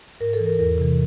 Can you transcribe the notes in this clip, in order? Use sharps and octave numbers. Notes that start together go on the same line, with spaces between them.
G#2 A#4
A4
E3
A#4
E2 A#4
C3 E3